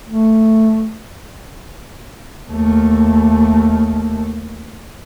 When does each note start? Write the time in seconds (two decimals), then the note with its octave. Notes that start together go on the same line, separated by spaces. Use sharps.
0.08 A3
2.51 D#2 A3